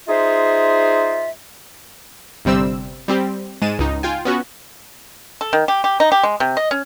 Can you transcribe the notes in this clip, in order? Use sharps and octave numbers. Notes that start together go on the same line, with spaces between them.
D#4 F4 G#4 C5 E5
G1 C3 G3 C4 E6
G3 C4 G4
G#2 G#3 A6 D#7 E7
C#2 D#4
F4 G5 G#5
B3 C#4 F#4
A4
D#3
G4
G4
D#4
G4
G#3
C3
D#5
C#4